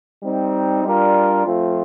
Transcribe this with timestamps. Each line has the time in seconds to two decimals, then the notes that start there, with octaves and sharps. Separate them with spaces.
0.23 G3 C4 D#4
0.84 G3 D4 F4 A#4
1.45 F3 A3 C4 F4